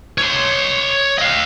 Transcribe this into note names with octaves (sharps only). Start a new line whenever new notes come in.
C#5 C6
D#5 F5